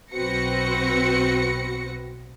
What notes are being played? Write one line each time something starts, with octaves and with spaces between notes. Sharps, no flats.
B1 C4 F#4 B4 A#6 C#7